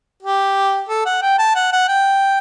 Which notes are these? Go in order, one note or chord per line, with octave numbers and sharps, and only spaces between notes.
G4
A4
F#5
G5
A5
F#5
F#5
G5